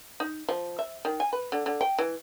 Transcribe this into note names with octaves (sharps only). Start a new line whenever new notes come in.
D#4
F3
E5
D#3
G#5
B4
D3
D3
G5
E3